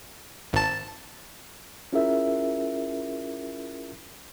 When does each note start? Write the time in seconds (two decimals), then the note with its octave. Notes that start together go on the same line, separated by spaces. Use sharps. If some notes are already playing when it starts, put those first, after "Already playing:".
0.53 G#1 A5
1.93 C#4 E4 F4 G#4 A#4 E5